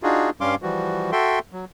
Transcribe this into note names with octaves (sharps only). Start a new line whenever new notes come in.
D4 D#4 F4 F#4 G#4
G2 G3 C#4 F5 C6 D6
E3 F3 G3 F#4
F#4 A4 E5 G5 C6
F#3